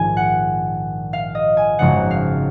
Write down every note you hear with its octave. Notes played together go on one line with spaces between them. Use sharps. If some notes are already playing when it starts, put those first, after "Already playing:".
Already playing: A#1 G#2 D#3 G#5
F#5
F5
D#5
G#5
G#1 F#2 C#3 F3 G#3 F#5
F5